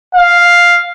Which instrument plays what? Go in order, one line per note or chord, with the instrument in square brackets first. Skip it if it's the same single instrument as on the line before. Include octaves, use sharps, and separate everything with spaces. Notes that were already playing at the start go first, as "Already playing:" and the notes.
[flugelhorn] F5